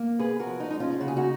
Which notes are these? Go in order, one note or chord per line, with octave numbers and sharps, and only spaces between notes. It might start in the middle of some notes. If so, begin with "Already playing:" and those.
Already playing: A#3
B3 G#4 B4
F#4 A#4
F3
D#4
G#3 D#4
C#4 F4
C#3 F#4
G#4
D#4 F#4